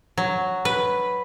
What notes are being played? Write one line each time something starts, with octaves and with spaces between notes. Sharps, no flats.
F#3
B4